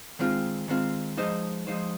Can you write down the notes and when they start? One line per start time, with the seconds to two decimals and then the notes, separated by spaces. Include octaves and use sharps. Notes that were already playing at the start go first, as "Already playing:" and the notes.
0.19 D#3 G#3 C4 F4
0.68 D#3 G#3 C4 F4
1.17 F3 G#3 D#4 C5 D#5
1.67 F3 G#3 D#4 C5 D#5